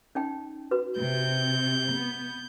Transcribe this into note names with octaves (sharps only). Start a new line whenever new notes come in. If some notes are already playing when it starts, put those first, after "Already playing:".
C#4 D#4 G5
F#4 B4
C3 G6
B3